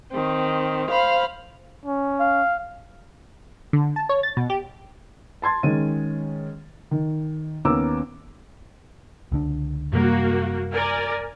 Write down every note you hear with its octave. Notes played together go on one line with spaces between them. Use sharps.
D#3 C4
C5 F5 B5
C#4
F5
D3
A5
C#5
A6
B2
G4
A5 C6 G#6 A6
D#3 G#3 C#4 D#7
D#3
D#2 B3 C#4 A#5 D6 E6
C#2 D3 D4
F#2 C3 G3 A#3 F#4
A#4 D5 G#5